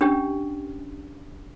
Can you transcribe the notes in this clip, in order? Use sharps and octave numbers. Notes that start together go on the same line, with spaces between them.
C#4 D4 G4